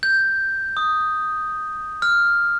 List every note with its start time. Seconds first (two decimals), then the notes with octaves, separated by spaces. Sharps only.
0.03 G6
0.77 D#6
2.02 F6